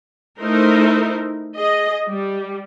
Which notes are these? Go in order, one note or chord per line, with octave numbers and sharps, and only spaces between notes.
A3 D#4 E4 A#4 C5
G#4 D#5
G3